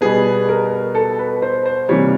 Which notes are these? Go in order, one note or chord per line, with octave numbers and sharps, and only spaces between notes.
B2 G3 B3 G#4
A#4
A4
B4
C5
C5
C3 E3 G3 A#3 C#5